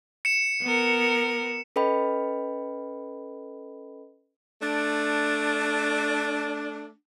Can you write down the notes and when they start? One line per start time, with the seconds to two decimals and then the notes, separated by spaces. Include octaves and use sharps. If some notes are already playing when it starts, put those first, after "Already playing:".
0.25 C#7 E7
0.61 B3 A#4
1.76 C#4 A4 B4 D#5 G5 B5
4.61 A3 D4